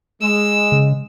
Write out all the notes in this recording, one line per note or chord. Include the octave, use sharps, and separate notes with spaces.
G#3 E6
C#3